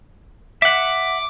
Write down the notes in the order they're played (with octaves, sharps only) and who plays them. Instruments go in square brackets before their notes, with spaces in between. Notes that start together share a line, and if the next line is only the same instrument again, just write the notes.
[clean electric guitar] E5 F#5 [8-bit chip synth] D6